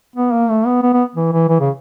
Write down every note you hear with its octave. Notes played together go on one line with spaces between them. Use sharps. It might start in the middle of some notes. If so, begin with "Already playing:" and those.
B3
A#3
A3
B3
B3
B3
E3
E3
E3
C#3